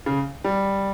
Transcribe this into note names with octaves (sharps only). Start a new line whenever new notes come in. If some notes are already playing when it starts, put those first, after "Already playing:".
C#3
G3